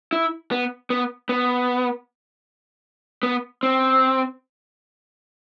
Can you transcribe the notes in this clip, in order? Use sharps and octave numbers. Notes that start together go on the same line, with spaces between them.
E4
B3
B3
B3
B3
C4